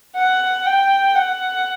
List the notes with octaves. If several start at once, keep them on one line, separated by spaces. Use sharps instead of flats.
F#5
G5
F#5